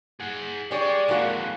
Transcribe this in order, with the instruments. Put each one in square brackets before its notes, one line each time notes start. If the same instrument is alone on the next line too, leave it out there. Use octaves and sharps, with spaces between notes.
[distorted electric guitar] G#4 F#5
[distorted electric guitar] G#3 [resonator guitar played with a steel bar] G4 C#5 [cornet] D5
[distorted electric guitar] F2 A2 [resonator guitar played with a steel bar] G#3 A#3 F#4